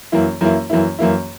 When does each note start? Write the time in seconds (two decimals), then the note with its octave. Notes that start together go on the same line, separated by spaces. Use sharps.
0.12 F#2 E3 A#3 E4
0.41 F#2 E3 A#3 E4
0.70 F#2 E3 A#3 E4
0.99 F#2 E3 A#3 E4